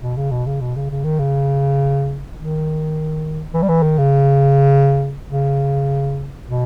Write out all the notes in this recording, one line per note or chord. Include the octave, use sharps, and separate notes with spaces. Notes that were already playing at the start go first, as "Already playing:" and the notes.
B2
C#3
B2
C#3
B2
C#3
C#3
D#3
C#3
D#3
E3
G3
E3
D#3
C#3
C#3
B2